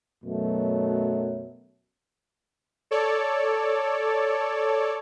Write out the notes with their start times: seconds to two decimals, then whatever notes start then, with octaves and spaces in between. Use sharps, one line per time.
0.24 F#2 B2 F#3 A3
2.91 A4 C#5 D5